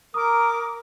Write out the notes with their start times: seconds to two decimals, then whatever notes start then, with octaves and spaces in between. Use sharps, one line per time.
0.14 A#4 A#5 D6 D#6